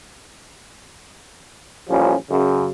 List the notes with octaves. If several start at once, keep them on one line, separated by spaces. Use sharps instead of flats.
A1 A#2 F3 G3 C#4
F#2 C#3